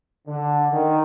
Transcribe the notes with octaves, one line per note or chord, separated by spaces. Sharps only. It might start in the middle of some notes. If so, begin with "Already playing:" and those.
D3
D#3